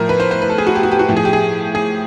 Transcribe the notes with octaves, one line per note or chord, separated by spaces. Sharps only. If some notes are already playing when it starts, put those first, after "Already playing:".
Already playing: A2 F3 A#4
B4
C5
C5
B4
A4
G#4
F#4
G4
F#4
G4
F#4
A2 F3 G4
G#4
G4
G#4
G#4